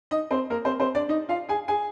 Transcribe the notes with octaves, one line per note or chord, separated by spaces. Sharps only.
D#4 D#5
C4 C5
A#3 A#4
C4 C5
C4 C5
D4 D5
D#4 D#5
F4 F5
G#4 G#5
G#4 G#5